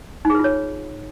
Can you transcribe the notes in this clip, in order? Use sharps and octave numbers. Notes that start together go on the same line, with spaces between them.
D#4 F4 G#4 B4 C#5